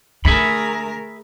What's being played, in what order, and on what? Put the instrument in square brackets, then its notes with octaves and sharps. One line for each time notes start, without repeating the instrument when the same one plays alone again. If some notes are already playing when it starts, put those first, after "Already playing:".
[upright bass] D3 [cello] A3 A#4 [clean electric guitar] G#4 E5 B5